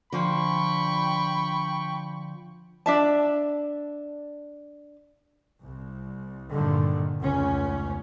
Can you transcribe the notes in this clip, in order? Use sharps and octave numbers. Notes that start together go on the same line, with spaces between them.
D3 F3 G5 B5 C#6
D4 E5 A5
C2
G2 A#2 D3 D#3
F1 C#2 C#4